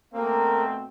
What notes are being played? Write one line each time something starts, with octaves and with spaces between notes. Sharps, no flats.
B2 A3 A#3 C4